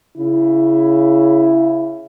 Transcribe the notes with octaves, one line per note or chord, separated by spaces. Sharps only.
C#3 E4